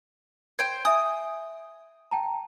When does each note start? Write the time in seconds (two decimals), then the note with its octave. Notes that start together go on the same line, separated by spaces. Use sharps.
0.59 C5 G5 G#6
0.85 E5 G#5 D#6
2.11 G5 A5 A#5